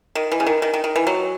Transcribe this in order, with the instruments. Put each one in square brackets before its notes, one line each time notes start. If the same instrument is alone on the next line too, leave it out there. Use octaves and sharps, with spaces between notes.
[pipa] D#3
E3
C#3
D#3
D#3
D#3
D#3
E3
F#3